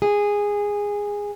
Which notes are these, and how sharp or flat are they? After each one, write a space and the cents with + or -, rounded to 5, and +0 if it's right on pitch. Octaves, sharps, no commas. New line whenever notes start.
G#4 -15